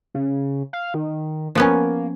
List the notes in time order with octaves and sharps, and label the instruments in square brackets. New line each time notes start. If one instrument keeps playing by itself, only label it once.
[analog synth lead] C#3
F5
D#3
[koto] F3 B3 C#4 [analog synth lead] A#3